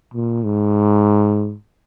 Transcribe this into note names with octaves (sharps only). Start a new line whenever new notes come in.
A#2
G#2